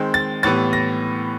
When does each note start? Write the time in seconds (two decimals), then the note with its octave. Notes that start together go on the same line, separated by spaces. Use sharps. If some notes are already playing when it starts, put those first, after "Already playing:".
Already playing: D#3 G#3 C4
0.14 A6
0.43 A2 E3 G3 B3 A6
0.73 A#6